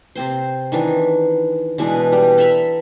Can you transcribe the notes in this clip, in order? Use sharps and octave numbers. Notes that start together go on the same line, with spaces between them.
C3 C4 C5
D#3 E3 D4
B2 E3 G#3 D4
G3
A4 E5 A#5 B5